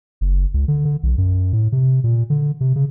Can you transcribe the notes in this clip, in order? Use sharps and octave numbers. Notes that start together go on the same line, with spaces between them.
F#1
C#2
D3
D3
B1
F#2
A2
C3
A#2
D3
C3
C#3